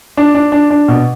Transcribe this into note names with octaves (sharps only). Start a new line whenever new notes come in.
D4
D4
D4
D4
B2